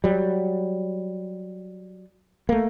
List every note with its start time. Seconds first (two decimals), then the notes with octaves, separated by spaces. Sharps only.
0.04 F#3 G3
2.49 A3 A#3